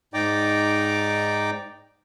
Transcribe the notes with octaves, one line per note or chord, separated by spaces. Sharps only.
G#2 D#4 D5 G5 A#5 D6